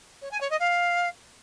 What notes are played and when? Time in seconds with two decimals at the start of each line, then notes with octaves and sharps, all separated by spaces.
0.21 C#5
0.31 G#5
0.41 C#5
0.50 D#5
0.60 F5